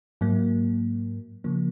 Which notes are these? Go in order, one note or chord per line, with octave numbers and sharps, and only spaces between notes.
G#2 F#3 A#3
C#3 F3 A#3